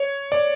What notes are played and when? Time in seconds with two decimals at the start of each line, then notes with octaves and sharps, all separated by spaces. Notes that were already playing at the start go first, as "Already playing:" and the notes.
Already playing: C#5
0.32 D5